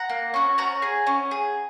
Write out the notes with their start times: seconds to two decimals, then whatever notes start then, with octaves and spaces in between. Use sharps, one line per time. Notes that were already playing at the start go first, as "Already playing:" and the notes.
Already playing: F#5 A#5
0.09 A#3
0.34 C#4 F#4
0.58 C#4 F#5 A#5
0.82 G#4
1.07 C#4
1.31 G#4